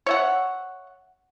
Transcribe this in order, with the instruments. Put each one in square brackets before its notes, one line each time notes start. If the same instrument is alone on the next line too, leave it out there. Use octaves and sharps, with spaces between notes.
[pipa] C#5 E5 F#5